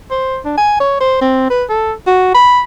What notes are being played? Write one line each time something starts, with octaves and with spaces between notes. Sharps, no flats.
C5
D4
G#5
C#5
C5
C4
B4
A4
F#4
B5